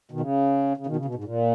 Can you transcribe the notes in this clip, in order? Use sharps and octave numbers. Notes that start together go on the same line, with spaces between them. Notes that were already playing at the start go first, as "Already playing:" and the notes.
B2 D#3
C#3
C#3
B2 D#3
C#3
B2
G#2
A#2